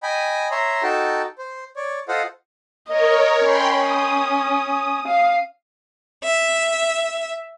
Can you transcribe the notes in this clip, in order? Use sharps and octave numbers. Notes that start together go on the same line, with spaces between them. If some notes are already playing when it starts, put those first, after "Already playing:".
D#5 G5 G#5 B5
C#5 E5 A#5 C6
D#4 F#4 A4 G5 A5
C5
C#5 D5
F4 A4 C5 D#5 F5 F#5
A#4 C#5 D#5
C#4 G5 B5 C6
D#6
F5
E5